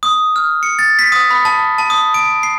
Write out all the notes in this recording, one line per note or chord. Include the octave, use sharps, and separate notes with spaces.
D#6
F6
C#7
A6
B6
D#6
B5
A5
A5
D#6
D7
C7